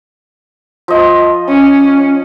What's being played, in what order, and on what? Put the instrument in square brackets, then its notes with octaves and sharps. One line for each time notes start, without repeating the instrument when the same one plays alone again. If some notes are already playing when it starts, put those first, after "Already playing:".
[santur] F3 D#5
[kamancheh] C#4